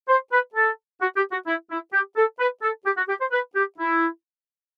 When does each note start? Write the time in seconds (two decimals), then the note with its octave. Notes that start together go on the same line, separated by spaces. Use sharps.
0.09 C5
0.32 B4
0.55 A4
1.01 F#4
1.17 G4
1.32 F#4
1.47 E4
1.70 E4
1.93 G4
2.16 A4
2.39 B4
2.62 A4
2.85 G4
2.97 F#4
3.08 G4
3.20 C5
3.31 B4
3.55 G4
3.78 E4